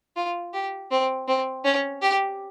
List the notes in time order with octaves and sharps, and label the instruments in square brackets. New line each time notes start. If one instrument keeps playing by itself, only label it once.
[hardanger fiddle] F4
G4
C4
C4
C#4
G4